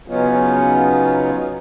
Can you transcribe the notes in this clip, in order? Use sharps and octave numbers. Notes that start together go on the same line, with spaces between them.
C#3 F#3 B3 C#4 D#4 F4